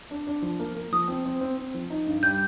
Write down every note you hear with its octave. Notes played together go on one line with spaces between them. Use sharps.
D4
D4
F3
A#3
A#3
F3 D#6
C4
C4
C4
C4
F3
D#4
G2
G3 G6